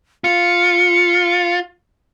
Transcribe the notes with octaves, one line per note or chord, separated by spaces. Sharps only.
F4 C#7